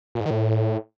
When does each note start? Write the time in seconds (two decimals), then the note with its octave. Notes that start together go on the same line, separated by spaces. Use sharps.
0.15 A#2
0.20 G#2
0.25 D#3
0.31 A2